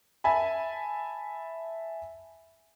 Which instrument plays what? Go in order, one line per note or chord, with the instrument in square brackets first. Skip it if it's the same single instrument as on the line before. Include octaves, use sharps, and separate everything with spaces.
[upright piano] E5 G#5 A5 B5